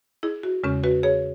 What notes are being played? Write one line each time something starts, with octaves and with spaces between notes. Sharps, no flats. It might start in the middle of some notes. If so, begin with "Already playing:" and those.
E4 G#4
F#4
E2 C#3 G#3 C#4
F#4 B4
G#4 C#5